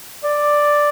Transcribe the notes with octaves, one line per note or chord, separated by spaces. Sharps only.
D5